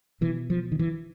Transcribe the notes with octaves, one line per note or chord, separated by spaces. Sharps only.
B2 E3
F3
D#3
E3